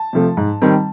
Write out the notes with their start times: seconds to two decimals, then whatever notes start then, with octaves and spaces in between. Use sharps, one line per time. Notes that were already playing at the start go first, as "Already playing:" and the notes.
Already playing: A5
0.13 C3 F3 A3
0.37 G#2
0.62 D#3 G3 C4